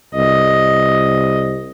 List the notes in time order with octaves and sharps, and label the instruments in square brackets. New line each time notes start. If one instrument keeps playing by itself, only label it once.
[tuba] C2 [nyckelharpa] D#5